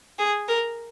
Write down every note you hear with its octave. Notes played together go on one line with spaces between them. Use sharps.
G#4
A#4